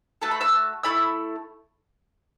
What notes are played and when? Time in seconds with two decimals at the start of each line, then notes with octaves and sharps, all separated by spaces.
0.22 A3 F#4 A4 A5
0.31 B5
0.41 E5 A5
0.83 A3 E4 A4 B5 E6